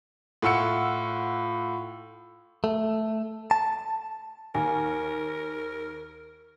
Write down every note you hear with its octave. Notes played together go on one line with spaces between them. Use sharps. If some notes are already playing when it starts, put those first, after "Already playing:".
A2 F4 F#5 E6 C#7
A3
A5
D#2 A#4 G#5